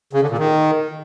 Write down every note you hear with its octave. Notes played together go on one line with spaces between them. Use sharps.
C#3
D3
A#2
D#3